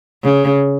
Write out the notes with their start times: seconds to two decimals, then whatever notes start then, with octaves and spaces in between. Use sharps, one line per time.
0.24 C#3